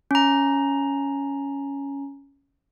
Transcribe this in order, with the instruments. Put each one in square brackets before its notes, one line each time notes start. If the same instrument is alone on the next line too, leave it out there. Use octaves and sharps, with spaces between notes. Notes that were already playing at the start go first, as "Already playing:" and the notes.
[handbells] C#4 A#5